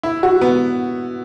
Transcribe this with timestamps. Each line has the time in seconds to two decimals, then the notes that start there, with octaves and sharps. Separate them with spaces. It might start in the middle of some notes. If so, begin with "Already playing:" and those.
0.03 E4
0.23 F#4
0.41 B3